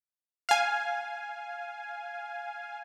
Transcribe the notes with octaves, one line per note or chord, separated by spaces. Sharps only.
F5 G#5